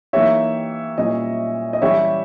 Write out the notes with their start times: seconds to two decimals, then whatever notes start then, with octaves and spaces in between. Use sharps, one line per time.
0.13 E3 A#3 D#4 G4 C#5 E5
0.98 A#2 G3 C#4 E4 D#5
1.73 D#5
1.82 E3 G3 C#4 G4 C#5 E5